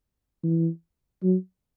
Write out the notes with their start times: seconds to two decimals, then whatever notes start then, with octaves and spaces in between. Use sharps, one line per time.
0.43 E3
1.23 F#3